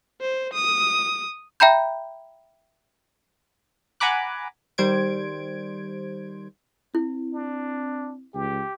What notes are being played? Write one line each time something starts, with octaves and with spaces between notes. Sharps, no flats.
C5
D#6
E5 G5 A#5 B5 G6
F#5 G#5 A#5 B5 D6 F#6
D#3 G3 C5 G#6 D7
C4 E4
D4
C#2 G4